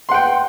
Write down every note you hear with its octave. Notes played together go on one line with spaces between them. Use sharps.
F#5 G5 C6